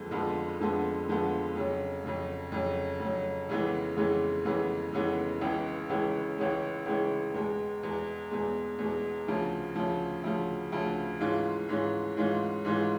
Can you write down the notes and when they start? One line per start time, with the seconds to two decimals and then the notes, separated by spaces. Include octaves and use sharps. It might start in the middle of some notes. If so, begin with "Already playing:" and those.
Already playing: F2 D3 F3 G#3 B3
0.11 F2 D3 F3 G#3 B3
0.60 F2 D3 F3 G#3 B3
1.08 F2 D3 F3 G#3 B3
1.55 F2 C#3 F#3
2.04 F2 C#3 F#3
2.52 F2 C#3 F#3
3.00 F2 C#3 F#3
3.49 F2 C#3 E3 G#3 B3
3.97 F2 C#3 E3 G#3 B3
4.45 F2 C#3 E3 G#3 B3
4.93 F2 C#3 E3 G#3 B3
5.41 C#2 C#3 E3 G#3 C#4
5.89 C#2 C#3 E3 G#3 C#4
6.38 C#2 C#3 E3 G#3 C#4
6.86 C#2 C#3 E3 G#3 C#4
7.34 E2 B2 G#3
7.83 E2 B2 G#3
8.31 E2 B2 G#3
8.79 E2 B2 G#3
9.28 D2 C#3 F3
9.75 D2 C#3 F3
10.24 D2 C#3 F3
10.72 D2 C#3 F3
11.20 G#2 E3 G#3 C#4 F4
11.69 G#2 E3 G#3 C#4 F4
12.17 G#2 E3 G#3 C#4 F4
12.65 G#2 E3 G#3 C#4 F4